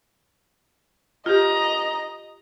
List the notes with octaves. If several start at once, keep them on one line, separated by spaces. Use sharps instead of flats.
F4 G4 D#5 A#5